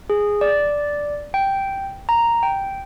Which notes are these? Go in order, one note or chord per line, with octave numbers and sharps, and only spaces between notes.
G#4
D5
G5
A#5
G5